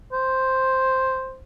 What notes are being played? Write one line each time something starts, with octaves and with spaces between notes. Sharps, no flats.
C5